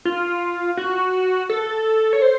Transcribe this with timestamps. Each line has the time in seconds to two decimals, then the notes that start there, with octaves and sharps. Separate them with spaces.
0.05 F4
0.77 F#4
1.49 A4
2.13 C#5
2.22 C5